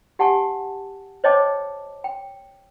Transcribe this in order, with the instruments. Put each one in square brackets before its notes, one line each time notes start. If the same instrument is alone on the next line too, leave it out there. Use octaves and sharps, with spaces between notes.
[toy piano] G4 F#5 G#5 A5 C#6
C5 C#5 D#5 G5 A5 D6
G5